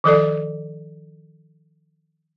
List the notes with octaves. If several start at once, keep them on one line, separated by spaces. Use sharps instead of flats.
D#3 F3 A4 D5